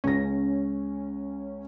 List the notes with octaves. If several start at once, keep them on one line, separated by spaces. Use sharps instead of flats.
C#2 C#4 A#6